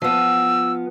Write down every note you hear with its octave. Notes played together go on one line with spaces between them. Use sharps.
F3 B3 E6